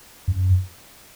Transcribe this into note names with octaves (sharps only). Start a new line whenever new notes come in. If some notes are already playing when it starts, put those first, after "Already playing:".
F#2